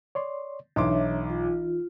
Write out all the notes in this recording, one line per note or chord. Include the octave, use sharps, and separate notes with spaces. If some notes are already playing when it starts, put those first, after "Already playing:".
C#5 D5 C6
B1 E3 D4 D#4 C#5 E5 C6 D6
F4